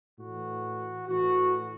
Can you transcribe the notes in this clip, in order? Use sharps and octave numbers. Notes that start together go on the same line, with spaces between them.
A2 E3 F#4
A2 E3 F#4